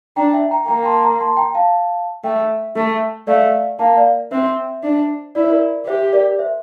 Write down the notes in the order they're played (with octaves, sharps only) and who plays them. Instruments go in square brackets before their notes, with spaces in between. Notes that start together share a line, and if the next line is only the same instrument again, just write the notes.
[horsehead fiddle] D4 [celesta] G5 A#5
[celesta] E5 G5
G5 A#5
[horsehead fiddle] A#3 [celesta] G5 A#5
[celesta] A5 C6
G5 A#5
A5 C6
G5 A#5
F5 A5
[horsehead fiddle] A3 [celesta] E5 G5
[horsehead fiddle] A3
[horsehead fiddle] A3 [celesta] D5 F5
[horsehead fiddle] A#3 [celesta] F5 A5
[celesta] D5 F5
[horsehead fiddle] C4 [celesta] C5 E5
[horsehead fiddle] D4
[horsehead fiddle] E4 [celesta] D5
[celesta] C5
A#4 D5
[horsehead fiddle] G4 [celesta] C5 E5
[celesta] A#4 D5
C5 E5